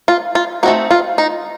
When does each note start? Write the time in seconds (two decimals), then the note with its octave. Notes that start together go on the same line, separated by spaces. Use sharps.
0.08 F4
0.35 F4
0.63 A3 C4 D#4 F#4
0.91 F4
1.18 D#4